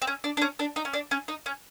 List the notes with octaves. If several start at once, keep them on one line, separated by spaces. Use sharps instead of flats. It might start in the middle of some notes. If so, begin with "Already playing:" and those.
C4
C#4
D4
D4
C#4
D4
D#4
C#4
D4
C#4
D#4
C#4